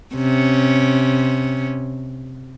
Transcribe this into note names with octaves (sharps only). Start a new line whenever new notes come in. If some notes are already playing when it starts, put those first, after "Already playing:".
C3 C#4